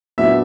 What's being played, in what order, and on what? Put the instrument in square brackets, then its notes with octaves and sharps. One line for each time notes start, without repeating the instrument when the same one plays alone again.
[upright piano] A#2 F#3 B3 D4 [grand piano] E5